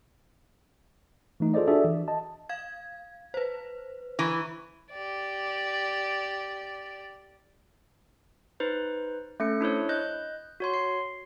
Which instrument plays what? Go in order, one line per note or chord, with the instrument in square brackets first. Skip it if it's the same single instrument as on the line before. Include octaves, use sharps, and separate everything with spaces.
[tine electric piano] E3 A3 D#4
F4 G#4 A4 C5 D5 D#5
D4 F#4 G#4 A4 D5 E5
E3
D#5 A5
[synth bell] F5 G#6
B4 C5
[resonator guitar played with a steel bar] E3 [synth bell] A#5 B5 C#6
[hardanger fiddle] G4 D5
[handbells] D#4 B4 C5
A3 C#4 A4 C#7
D4 E4 C5 C#5
D#5 F#6 G6
F#4 C#5 C6
C7